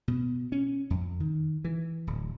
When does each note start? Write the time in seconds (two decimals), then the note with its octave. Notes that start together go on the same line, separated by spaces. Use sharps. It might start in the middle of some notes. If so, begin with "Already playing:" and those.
0.08 B2
0.52 C#4
0.90 F2
1.20 D#3
1.65 E3
2.07 D1